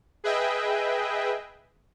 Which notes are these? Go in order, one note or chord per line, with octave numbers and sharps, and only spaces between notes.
G#4 B4 D#5 E5 G5